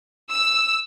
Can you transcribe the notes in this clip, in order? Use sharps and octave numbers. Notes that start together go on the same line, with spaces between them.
E6